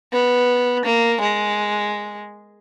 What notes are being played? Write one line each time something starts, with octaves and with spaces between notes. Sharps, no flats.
B3
A#3
G#3